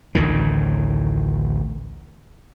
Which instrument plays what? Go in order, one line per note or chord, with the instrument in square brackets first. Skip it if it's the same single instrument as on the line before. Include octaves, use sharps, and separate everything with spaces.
[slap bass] A1 D2 A2 D#3